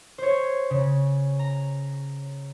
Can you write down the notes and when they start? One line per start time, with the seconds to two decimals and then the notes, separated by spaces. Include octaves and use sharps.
0.18 C5 C#5
0.70 C#3
1.39 A#5